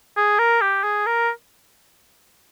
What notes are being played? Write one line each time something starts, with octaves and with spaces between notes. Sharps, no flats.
G#4
A#4
G4
G#4
A#4